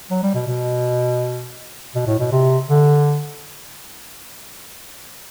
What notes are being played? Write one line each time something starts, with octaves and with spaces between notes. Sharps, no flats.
F#3
G3
B2
B2
B2
A2
B2
C3
D3